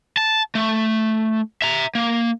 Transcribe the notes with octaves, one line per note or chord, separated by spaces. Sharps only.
A5
A3
E5 A#5
A#3